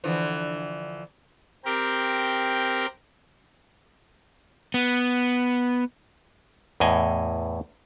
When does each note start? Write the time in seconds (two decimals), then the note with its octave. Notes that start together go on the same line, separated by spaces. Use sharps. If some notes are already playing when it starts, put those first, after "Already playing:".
0.04 D3 E3 F3
1.65 C4 G4 A#4
4.74 B3
6.80 E2 A2 D#5 G#5